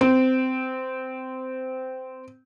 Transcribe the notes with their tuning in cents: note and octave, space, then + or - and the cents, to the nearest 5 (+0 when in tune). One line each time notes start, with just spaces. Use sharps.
C4 -15